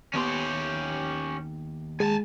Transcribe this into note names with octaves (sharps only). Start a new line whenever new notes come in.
D#2 B3 C#4 G4 C6
G#3 G#5 A5